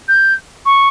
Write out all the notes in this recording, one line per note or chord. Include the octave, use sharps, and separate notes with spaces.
G6
C#6